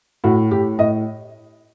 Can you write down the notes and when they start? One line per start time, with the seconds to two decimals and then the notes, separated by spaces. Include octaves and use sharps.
0.24 A2 F#4
0.51 A2 G4
0.78 A2 D#5